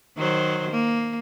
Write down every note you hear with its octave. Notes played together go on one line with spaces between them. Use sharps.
D#3 F#3 C5
A#3